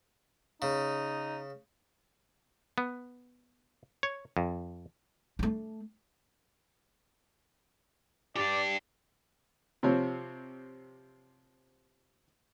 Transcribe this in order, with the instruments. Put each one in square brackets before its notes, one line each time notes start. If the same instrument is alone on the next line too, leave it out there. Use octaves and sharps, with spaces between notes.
[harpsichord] C#3 [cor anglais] D#4
[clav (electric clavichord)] B3
C#5
F2
[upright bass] A3 D4
[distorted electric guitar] D4 G4 [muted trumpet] D5
[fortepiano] C3 F3 C4 C#5